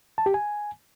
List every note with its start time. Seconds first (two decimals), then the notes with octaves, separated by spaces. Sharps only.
0.18 A5
0.26 G4
0.34 G#5